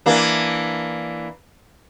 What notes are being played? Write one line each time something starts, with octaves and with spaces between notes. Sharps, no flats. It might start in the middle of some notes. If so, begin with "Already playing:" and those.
E3 A#3 D4